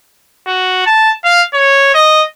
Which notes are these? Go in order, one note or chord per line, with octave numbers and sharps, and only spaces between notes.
F#4
A5
F5
C#5
D#5